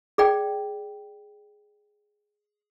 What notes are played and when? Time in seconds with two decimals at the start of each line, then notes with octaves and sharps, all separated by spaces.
0.18 G#4 D5 G5